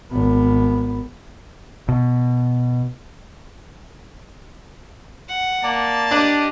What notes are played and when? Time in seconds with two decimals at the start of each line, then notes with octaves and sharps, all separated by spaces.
0.12 G#1 B3
1.88 B2
5.29 F#5
5.64 A#3 D5 A5
6.11 D4 G4 D#5